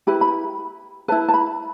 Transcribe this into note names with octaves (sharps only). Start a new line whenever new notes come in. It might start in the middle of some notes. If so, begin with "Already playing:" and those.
E4 G4 B4 B5
B5
E4 B4 A5
A5
B5